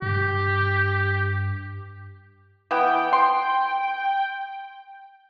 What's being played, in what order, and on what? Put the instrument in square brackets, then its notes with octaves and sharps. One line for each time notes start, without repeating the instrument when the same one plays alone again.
[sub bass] G2 [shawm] G4
[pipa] E3 B3 [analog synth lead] G5
[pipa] C6